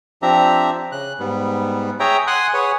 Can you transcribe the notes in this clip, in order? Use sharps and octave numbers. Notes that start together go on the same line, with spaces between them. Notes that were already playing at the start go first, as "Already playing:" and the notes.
F3 C4 D4 G4 E5 A#5
C#3 F#6
G#2 G3 B3
G#4 C#5 E5 G5 A#5
F#5 G#5 C6 D#6 F#6
G#4 B4 C#5 F#5